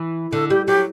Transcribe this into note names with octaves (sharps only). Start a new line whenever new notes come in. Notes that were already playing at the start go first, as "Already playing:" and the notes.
Already playing: E3
D3 A4
G3 G4
F#3 G4